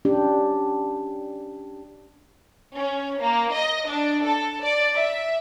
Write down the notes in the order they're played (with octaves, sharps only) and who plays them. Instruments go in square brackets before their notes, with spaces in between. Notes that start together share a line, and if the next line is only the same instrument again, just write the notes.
[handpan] C#4 D4 G4
[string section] C#4
A#3
D#5
D4
A4
D5
E5